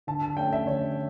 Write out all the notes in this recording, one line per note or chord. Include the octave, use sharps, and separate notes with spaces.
D3 A5
A5
A3 C#4 G5
E5
D3 C#5